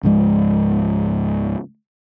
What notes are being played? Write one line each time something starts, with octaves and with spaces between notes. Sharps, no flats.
C#2 G#2 F3 G#3